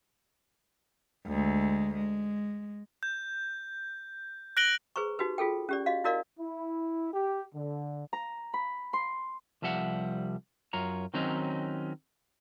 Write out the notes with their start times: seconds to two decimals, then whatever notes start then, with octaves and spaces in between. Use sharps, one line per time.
1.26 D2 G#3
1.94 G#3
3.03 G6
4.57 F#6 A#6 D7 F#7 G7
4.96 G#4 B4 C5 A#5 C#6
5.19 D#4 F#4 G4 B4
5.38 F4 G#4 A4 G5
5.69 C#4 G4 D5
5.86 F#4 D#5 F5
6.04 E4 F#4 A#4 D5 D#5 F5
6.40 E4
7.14 G4
7.55 D3
8.13 A#5
8.54 B5
8.93 C6
9.62 C2 F3 G3 E5 F#5
10.73 F#2 F4 C#5 A#5
11.14 D#3 F#3 C4 C#4 D#4